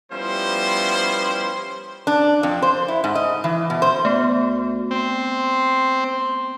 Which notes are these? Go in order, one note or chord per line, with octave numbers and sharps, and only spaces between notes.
F3 G3 B3 C#4 E4 C5
D4
F2
C5
E4
G#2
D#5
E3
B2
C5
D2 A3 B3
C4 C6